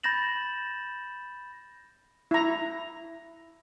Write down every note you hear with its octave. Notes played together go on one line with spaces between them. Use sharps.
B5 G6 A6 A#6 E7 F#7
E4 A#5